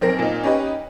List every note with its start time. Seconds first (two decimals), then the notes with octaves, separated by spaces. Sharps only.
0.01 B1 C4 A#4 A#6
0.19 A#2 D#4
0.43 C#4 D#4 G4 B4 D#5